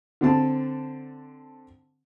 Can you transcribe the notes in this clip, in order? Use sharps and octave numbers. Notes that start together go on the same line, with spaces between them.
D3 C4 A5